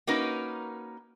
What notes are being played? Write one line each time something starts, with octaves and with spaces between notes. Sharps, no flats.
A#3 C#4 D#4 F#4 A#4 B4